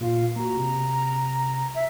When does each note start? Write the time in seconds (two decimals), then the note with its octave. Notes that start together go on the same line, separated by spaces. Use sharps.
0.01 A#2 F4 F5
0.36 A#3 F#4 A#5
0.57 C3
1.75 E5